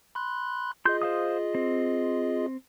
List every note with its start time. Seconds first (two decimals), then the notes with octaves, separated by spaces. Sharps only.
0.15 B5 C6 F#6
0.85 F4 G#4 D#5 C6 G6
1.02 C5 F5 D#6
1.55 C4